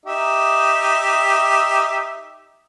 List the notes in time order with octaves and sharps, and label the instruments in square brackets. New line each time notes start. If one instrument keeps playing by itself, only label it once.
[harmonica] D#4 G4 E5